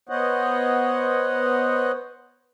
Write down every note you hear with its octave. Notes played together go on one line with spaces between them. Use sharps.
B3 C5 C#5 D#5 F#5